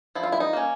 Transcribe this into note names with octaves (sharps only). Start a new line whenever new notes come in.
F3 E4
F4
E4
D#4
A#3 C#4